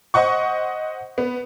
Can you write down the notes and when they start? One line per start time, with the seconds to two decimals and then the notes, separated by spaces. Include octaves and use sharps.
0.14 C5 D#5 F#5 C#6
1.18 B3